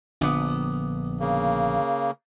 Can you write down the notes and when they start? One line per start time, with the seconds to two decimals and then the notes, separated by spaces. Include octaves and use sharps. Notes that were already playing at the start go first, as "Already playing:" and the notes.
0.21 A#1 D3 B3 D6 D#6
1.20 C#3 A#3